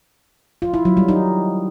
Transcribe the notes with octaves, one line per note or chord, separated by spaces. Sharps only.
F4
E4
F#3
G3
D#4